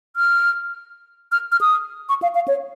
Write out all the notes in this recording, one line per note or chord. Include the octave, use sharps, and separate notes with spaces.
F6
F6
F6
D#6
C#6
F5
F5
C#5